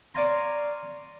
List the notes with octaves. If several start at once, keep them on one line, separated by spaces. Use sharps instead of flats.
C#5 D5 F5 G#5 A#5 C6